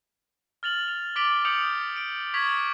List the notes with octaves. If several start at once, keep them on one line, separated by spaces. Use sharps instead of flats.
F6 A6 F7 F#7
F7
D6 A6 B6 D7 F#7 G7
D#6 G6 C#7 D7 F7 F#7
D#6 D7
C#6 D#6 G#6 B6 F7 F#7